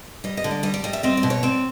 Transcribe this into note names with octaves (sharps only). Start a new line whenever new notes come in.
G3 D#5
D#5
D3
D5
G3 D#5
D5
G3 D#5
E5
C4 D#5
D5
B2
C#5
C4 D5